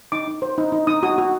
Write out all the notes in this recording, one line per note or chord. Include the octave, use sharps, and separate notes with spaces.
D#4 D6
D#4
C5
D#4
D#4
D#4 D#6
F#4 D#6
F#4